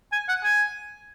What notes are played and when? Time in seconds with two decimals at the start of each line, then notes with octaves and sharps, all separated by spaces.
0.12 G#5
0.29 F#5
0.44 G#5